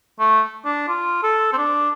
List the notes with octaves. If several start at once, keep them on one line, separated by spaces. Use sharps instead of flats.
A3
D4
F4
A4
C4
D4